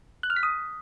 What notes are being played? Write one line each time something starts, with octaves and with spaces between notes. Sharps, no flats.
F#6
F6
B6
D#6